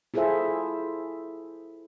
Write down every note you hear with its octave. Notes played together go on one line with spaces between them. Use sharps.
E4 F4 G#4 A4 C5 E5